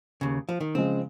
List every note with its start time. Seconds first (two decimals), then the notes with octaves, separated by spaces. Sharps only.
0.21 D#2 C#3
0.49 F3
0.61 D#3
0.75 C#3 F3 G#3 C4